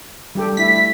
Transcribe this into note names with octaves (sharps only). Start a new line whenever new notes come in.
G3 G4 A4
A3 E4 B6